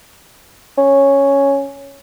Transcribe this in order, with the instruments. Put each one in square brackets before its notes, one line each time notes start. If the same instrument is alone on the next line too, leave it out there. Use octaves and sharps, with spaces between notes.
[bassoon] C#4